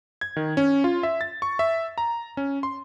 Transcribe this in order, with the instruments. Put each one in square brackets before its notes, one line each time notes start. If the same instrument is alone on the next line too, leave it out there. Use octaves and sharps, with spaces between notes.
[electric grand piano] G#6
D#3
C#4
F4
E5
A6
C#6
E5
A#5
C#4
C6